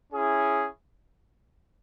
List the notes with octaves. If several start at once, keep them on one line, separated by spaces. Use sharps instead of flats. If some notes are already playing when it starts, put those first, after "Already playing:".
C#4 E4 G#4